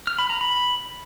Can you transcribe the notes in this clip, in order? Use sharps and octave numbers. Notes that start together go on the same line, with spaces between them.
F6
B5
A#5
B5